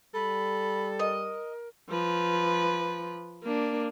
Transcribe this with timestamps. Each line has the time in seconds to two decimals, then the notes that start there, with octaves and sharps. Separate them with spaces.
0.14 G3 A4 B5
0.99 A#4 D#5
1.90 F3 B4
3.43 A#3 D4